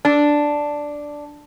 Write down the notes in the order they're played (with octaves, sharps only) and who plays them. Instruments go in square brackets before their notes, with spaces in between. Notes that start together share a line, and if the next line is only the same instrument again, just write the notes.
[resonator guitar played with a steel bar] D4